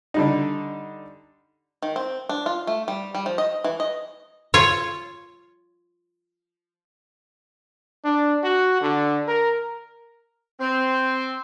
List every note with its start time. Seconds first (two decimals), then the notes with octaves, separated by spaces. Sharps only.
0.14 D3 G3 D#4
1.82 D#3
1.96 C4
2.29 D4
2.46 F4
2.67 A3
2.88 G3
3.15 G3
3.26 F3
3.38 D#5
3.64 E3
3.80 D#5
4.54 F4 C#5
8.05 D4
8.44 F#4
8.81 D3
9.28 A#4
10.60 C4